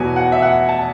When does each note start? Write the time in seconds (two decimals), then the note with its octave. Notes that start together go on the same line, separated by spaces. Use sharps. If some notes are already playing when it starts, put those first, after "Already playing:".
Already playing: E2 B2 F#3 B3 G#5
0.16 F#5
0.32 E5
0.42 F#5
0.69 A5